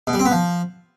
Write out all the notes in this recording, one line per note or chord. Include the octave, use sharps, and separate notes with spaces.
B2
G3
C4
B3
F3